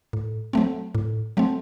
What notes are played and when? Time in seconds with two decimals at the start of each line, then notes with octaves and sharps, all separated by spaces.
0.13 A2
0.53 F#3 A3 C4
0.95 A2
1.37 F#3 A3 C4